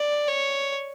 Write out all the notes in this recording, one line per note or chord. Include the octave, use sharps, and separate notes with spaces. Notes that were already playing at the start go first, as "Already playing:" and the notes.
Already playing: D5
C#5